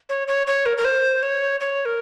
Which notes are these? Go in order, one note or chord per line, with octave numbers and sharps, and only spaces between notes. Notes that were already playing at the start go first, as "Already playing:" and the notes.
C#5
C#5
C#5
A#4
A#4
C5
C#5
C#5
A#4